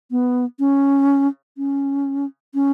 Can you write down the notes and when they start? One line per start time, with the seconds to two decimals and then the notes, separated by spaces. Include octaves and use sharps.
0.11 B3
0.59 C#4
1.57 C#4
2.54 C#4